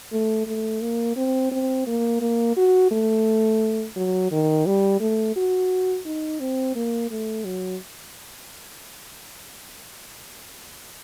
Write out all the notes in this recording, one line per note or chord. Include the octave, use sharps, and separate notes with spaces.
A3
A3
A#3
C4
C4
A#3
A#3
F#4
A3
F#3
D#3
G3
A3
F#4
D#4
C4
A#3
A3
F#3